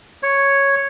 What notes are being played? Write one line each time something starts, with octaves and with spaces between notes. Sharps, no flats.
C#5